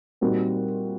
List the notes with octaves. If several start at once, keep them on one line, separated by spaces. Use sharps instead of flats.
A#2 G3 C4 D#4 F#4